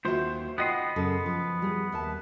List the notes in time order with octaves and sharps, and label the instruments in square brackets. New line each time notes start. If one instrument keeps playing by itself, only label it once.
[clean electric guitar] D#2 C5 [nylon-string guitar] F4 F#4 E5
[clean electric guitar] B3 D#5 C6 [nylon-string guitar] F#5 G5
[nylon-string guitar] F#2 C#3 A4
F3
G3 G#4
D#2 E5 A5